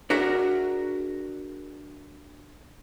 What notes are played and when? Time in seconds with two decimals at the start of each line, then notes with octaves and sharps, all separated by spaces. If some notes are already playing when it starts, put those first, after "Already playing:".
0.10 D4 F#4 G#4 A#4 E5 F#5